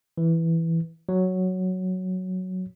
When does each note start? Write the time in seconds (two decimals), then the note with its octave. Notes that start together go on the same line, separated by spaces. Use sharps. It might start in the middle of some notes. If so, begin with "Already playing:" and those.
0.18 E3
1.09 F#3